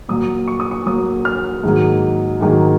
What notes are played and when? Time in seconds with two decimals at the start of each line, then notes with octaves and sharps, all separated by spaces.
0.09 A#2 F#3 A#3 D#6
0.48 C#6
0.60 D#6
0.71 C#6
0.86 A#2 F#3 A#3 D#6
1.25 F6
1.63 G#2 D#3 F#3 A#3
2.41 G#2 D#3 F#3 A#3